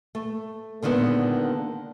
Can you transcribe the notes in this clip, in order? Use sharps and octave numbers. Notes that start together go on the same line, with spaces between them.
A3
A#2 D3 D#3 G#3 B3